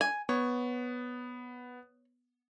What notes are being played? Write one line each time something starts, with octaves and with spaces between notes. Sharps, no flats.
G#5
B3 C#5